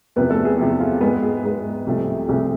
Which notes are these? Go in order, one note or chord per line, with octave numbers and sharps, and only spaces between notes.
E2 C3 F3 B3 B4
A3 A4
G#4
E2 C3 F3 G#4
F4
G#2 G#3 B3 G#4
G#4
G#2 G#3 B3
C2 C3 F3 A3
C2 C3 F3 A3 G#4